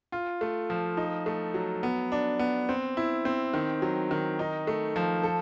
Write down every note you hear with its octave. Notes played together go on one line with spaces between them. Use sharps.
F4
A3
F3
D#4
A3
F#3
B3
D4
B3
C4
E4
C4
D#3
F#3
D#3
D#4
A3
F3
A4